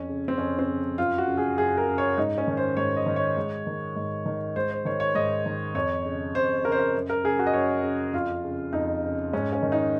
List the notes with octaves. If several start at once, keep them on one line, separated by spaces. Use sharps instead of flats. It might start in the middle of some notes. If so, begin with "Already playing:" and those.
Already playing: F2 C#4
C#3
C4
F2 C#4
C4
C#3
F#2 F4
F#4
C#3
G#4
F#2 G#4
A#4
C#3
C#5
G#2 D#4
C#4
D#3
C5
G#2 C#5
D#5
D#3
C#5
G#2
D#3
G#2
D#3
G#2 C5
C5
D#3 C#5
C#5
G#2 D#5
D#3
F2 C#5
C#3
F2 C5
C#3 A#4
C5
A#4
F#2
A#4
C#3 G#4
F#4
D#5
F#2 C#5
C#3
F2 F4
C#3
F2 D#4
C#3
G#2 C#4
C#4
D#3
D#4